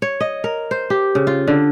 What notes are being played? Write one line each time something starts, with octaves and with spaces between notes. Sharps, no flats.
C#5
D#5
A#4
C5
G4
C#3
F4
D3